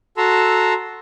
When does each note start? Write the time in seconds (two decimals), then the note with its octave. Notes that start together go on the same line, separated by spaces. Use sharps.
0.17 F#4 A4 A5 A#5 C6 E6